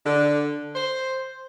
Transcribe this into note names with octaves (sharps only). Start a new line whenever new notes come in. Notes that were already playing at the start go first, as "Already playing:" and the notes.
D3
C5